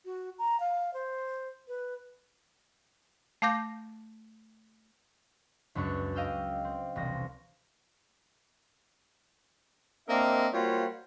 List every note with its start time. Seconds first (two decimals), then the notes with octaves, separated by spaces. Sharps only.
0.05 F#4
0.39 A#5
0.60 F5
0.94 C5
1.68 B4
3.42 A3 F5 D6 G6 A#6
5.75 C#2 F#2 D4 B4 C#6
6.15 D#5 F5 G5 E6
6.65 C4
6.96 E1 C2 A#6
10.08 A#3 C4 D4 A#4 D#5 E5
10.54 G3 A#3 F4 F#4 C5 C#5